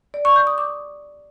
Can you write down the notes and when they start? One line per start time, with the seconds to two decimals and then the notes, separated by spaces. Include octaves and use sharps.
0.14 D5
0.25 C#6
0.36 G6
0.47 D#6
0.58 D6